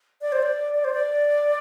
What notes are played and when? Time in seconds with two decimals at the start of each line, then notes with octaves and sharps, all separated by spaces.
0.21 D5
0.32 C5
0.42 D5
0.74 D5
0.84 C5
0.93 D5